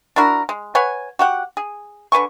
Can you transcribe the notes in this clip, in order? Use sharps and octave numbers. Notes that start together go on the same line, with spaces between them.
D4 E4 F#4 A#4
G#3
B4 C#5 F#5 G#5
F#4 G4 F#5
G#4
D3 B4 G#5 C#6